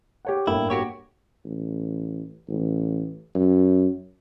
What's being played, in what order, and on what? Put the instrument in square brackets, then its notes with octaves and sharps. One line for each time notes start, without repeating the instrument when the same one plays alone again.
[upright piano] G4 C#5 F#5
[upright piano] G1 A2 G5 [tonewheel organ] A#3 [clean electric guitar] E4
[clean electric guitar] F#4 G4 C#5
[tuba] A1
A1
F#2